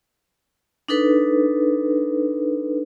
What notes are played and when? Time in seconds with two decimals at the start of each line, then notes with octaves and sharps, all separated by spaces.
0.89 D4 D#4 A4 B4